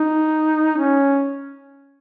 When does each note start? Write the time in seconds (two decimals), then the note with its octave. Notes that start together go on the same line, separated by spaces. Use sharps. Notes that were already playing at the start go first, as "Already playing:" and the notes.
Already playing: D#4
0.77 C#4